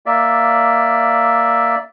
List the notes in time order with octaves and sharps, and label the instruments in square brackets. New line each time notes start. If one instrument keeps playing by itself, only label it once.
[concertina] A#3 D5 E5